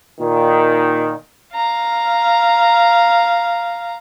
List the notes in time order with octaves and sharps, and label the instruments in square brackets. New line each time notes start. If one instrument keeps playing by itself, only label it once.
[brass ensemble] A#2 D#3
[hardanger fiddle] F5 A#5